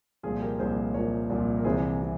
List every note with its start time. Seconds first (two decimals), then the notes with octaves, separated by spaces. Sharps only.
0.23 C2 A#2 F3 F4 G#4
0.42 G4 A#4
0.59 C2 A#2 F3 G#4 C5
0.94 C2 A#2 F3 A#4 C#5
1.30 C2 A#2 F3
1.57 A#4
1.65 C2 C3 E3 G#4 C5
2.02 C3